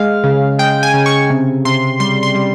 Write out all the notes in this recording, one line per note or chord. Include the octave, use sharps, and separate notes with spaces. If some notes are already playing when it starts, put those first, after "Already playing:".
Already playing: G#3 F5
C#3
G#3 G5
G#5
C#3
C#6
C3
C3 C6
G3 C6
C6
G3